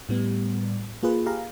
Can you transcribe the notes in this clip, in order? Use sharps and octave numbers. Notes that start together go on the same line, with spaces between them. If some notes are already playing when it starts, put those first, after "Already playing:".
A2 G3 B3
A#3 F4 G#4 B4
G4 G#4 F5 A#5